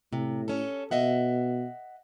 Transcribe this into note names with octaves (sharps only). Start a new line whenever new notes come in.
A2 C3
C#4 A4
B2 D#5 E5 F#5